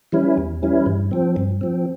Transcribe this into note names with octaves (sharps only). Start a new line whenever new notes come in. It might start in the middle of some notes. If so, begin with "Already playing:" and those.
E3 G3 C#4 E4
E2
E3 G3 C#4 E4
G2
F3 C4
G2
F3 C4